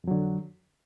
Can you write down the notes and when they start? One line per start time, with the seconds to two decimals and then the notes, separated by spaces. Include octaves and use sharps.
0.04 F2
0.07 F#3
0.11 D3